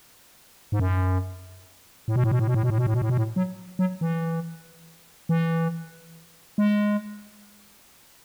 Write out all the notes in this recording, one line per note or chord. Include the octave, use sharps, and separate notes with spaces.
G#2
F#2
A2
B2
A2
B2
A2
B2
A2
B2
A2
B2
A2
B2
A2
B2
A2
F#3
F#3
E3
E3
G#3